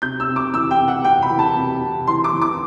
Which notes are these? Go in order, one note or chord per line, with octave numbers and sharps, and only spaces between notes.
C3 G6
E6
C3
D6
E3 E6
G5
C3
F#5
C3 G5
B5
E3
A5
C3
C3
E3 C6
D6
E3
D6